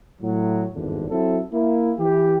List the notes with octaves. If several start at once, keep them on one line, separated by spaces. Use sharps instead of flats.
A2 F#3
G#1 E2 G2 D3
F#3 C4 E4 A4
A#3 E4
E3 G4